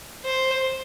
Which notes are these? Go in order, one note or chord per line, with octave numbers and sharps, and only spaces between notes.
C5